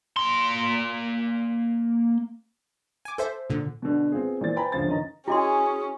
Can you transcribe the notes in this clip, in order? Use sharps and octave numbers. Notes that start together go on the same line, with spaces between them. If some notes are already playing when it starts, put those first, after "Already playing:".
A#3 C6
G#5 D6
A4 C5 E5
A#2 D3
B2 D3
B3 C4 F4 G#4
A#2 E3 C5 A6
B4 C5 G5 G#5 A#5 B5
D2 C#3 F3 C5 A6
G1 D#3 C#4 D#5 A#5
C#4 E4 F#4 G#4 D#5 C6